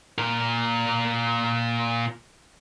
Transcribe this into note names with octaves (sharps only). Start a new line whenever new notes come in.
A#2 A#4